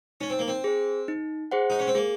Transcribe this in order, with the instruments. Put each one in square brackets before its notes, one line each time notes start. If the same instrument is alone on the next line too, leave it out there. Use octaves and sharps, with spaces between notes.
[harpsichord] C#4 [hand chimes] D#4
[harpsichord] C4
A#3
C4
[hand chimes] G#4 C5
D#4
G#4 C5 F#5
[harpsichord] D#4
C#4
C4
[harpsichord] A#3 [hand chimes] G#4